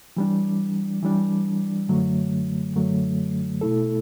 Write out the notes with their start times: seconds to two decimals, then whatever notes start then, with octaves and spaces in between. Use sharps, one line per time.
0.17 E3 G3 D4
1.03 E3 G3 D4
1.89 F#2 D3 F#3 A3
2.75 F#2 D3 F#3 A3
3.61 B2 A3 E4 A4